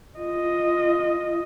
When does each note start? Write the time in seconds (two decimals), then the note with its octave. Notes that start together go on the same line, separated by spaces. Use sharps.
0.19 F4 D#5